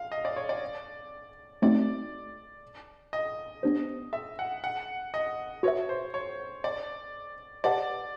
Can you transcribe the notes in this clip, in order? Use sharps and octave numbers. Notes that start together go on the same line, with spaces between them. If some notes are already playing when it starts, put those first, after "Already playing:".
Already playing: F5
D#5
D5
C#5
D5
A3 C4 D#4 F#4 D5
D#5
B3 D4 G4 C5
E5
F#5
F#5
D#5
F#4 B4 C#5 E5
C5
C#5
D5
G4 B4 D5 D#5 F#5 A5